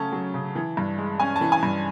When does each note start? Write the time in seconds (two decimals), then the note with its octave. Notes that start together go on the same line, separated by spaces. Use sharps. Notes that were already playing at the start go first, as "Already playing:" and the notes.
Already playing: C#3 F#3 A3 C#4 A5
0.12 F#3
0.34 C#3
0.55 E3
0.77 G2
0.98 G#3
1.20 C#4 G#5
1.36 A5
1.41 E3
1.52 G#5
1.63 G2